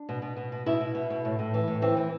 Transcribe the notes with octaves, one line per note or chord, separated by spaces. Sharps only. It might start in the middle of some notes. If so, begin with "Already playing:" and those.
Already playing: D4
B2
B2
B2
B2
B2 E4
B2
B2
B2
A2
A2
E3
A2
E3 C4
E3